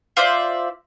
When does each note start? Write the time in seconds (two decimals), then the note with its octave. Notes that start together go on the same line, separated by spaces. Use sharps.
0.17 F4 C5 D5 E5